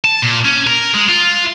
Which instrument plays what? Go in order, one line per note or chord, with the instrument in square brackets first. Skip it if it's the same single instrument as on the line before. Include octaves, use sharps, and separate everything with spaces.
[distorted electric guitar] A5
A#2
C#4
A#4
G#3
F4